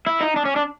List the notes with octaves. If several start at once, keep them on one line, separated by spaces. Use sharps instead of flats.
E4
D#4
D4
C#4
D4